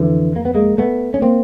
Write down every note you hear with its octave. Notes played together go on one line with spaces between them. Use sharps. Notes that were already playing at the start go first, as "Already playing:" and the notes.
Already playing: F2 D3 E3
A#3
B3
G#3 A#3
A3 B3
C#4
A#3 C4